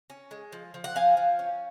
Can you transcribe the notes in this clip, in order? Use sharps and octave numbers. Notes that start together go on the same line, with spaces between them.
C#4
G#3
F3
F3
F#5
F3 F5 G#5
F3
C#4